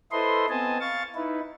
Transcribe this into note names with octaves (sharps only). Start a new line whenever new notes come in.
E4 A4 B4 C5 D#5 C6
B3 C4 D#5 G#5 A5
F5 C#6 A6
D#4 E4 B4